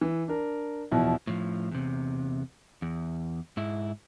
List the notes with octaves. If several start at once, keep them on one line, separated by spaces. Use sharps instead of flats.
E3
D4 A#4
E2 B2 F3 E4
A2 F3
E2 C3
E2
G#2 E4